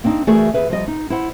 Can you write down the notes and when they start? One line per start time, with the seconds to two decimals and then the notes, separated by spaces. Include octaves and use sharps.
0.04 A#3 C4 D4 D#4
0.27 E3 A3 F#4 G#4 A#4 D5
0.54 D#2 G#4 B4 E5
0.70 F3 G3 D#5
0.88 D#4
1.10 E4 C5 F#5